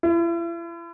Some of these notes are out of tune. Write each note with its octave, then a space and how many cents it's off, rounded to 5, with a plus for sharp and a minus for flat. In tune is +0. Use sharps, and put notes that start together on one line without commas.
E4 +40